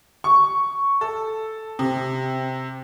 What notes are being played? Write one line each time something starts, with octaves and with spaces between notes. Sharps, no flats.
C#6
A4
C3